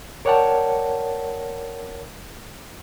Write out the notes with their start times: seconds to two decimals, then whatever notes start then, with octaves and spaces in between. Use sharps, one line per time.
0.25 A#4 C#5 D5 F#5 G5 A5